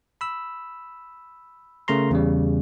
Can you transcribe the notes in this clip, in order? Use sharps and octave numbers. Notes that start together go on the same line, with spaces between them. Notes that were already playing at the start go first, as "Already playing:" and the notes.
B5 E6
C#3 A3 A#4 A#5 C6
E2 C#3 G3